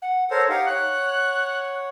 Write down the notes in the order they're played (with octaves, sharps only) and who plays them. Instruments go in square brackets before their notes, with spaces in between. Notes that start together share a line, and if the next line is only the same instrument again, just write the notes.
[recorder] F#5
[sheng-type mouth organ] A4 A#4 C5 [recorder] C#5
[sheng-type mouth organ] D#4 G4 F5 [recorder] F#5
[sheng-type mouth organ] C#5 F#5 [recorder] F#6